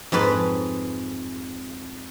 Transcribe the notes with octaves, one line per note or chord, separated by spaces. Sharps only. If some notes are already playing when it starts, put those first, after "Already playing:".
F2 G#2 B4 A5